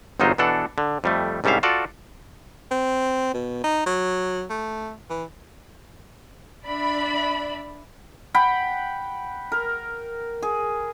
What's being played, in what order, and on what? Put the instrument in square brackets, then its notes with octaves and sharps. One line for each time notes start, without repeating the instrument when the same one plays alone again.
[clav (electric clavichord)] G1 E2 F#3 D#4 F4 C5
B2 E3 D4 A4 F#5
D3
F2 G3 A3
C2 G#2 G3 C#4 E5 F5
F4 F#4 A4 D5
[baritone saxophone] C4
B2
D#4
F#3
A3
E3
[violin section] D4 D5 E5 B5
[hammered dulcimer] F#5 G5 B5
A#4
G#4